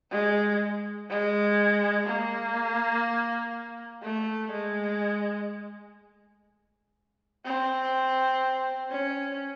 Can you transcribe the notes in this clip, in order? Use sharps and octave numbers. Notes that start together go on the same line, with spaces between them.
G#3
G#3
A#3
A3
G#3
C4
C#4